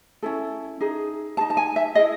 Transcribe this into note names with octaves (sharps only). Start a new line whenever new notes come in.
C#4 E4 A4
D#4 G#4
D#4 G#4 A5
A5
G#5
E5
E4 G#4 D#5